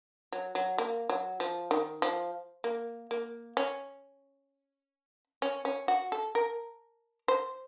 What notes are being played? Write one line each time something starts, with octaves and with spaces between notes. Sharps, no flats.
F#3
F#3
A#3
F#3
F3
D#3
F3
A#3
A#3
C#4
C#4
C#4
F#4
A4
A#4
C5